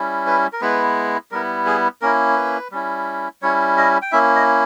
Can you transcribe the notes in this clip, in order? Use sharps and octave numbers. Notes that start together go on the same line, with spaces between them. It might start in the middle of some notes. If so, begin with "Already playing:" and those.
Already playing: G3 C#4 E4
B4
A#4
G#3 B3 E4 B4
G3 B3 E4 A#4
G#4
A#3 C#4 E4 A#4
B4
G3 C#4 E4
G3 C#4 E4 C#5
D#5
G5
A#3 C#4 E4 E5
D#5